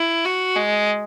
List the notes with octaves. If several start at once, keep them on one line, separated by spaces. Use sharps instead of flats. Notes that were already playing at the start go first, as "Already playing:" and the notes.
Already playing: E4
F#4
G#3